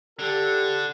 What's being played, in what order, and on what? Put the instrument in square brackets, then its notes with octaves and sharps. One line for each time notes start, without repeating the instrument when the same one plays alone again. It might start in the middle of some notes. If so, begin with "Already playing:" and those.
[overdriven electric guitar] D3 [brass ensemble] G4 A4